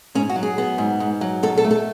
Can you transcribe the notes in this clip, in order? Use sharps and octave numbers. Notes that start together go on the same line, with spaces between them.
G#2 C#4
F#4
F#3
G#4
B3
G#2
G#2
F#3
B2 A4
A4
A3
A4